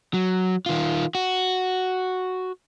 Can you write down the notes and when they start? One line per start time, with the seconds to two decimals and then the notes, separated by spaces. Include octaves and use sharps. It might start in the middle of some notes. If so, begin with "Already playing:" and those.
0.14 F#3
0.66 D#3 F4
1.15 F#4